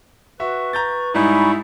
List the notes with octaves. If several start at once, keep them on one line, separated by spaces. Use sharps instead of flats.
F#4 B4 E5 C#6
A#5 G6 A6
G#2 G3 D#4 E4 G#5 B5 C#6